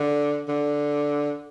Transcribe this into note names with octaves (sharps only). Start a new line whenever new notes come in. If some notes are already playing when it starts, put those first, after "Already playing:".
Already playing: D3
D3